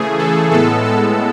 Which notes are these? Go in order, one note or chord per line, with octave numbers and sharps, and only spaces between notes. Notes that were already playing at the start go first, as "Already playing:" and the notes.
Already playing: C#3 E3 A3 G#4
A4
A2 G#3 B3 A4
A4